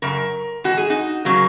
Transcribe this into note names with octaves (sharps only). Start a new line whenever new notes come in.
F#2 C#3 A#4
G#2 E3 F#4
G#4
D#4 F#4
C#3 F#3 A#3